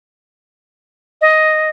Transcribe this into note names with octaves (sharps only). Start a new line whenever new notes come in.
D#5